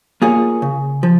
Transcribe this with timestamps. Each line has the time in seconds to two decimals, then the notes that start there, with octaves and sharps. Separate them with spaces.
0.22 A#3 F4 G#4 C#5
0.62 C#3
1.03 F3